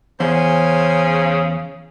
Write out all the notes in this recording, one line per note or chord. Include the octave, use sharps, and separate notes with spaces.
E2 C#3 A#4 C5 G#5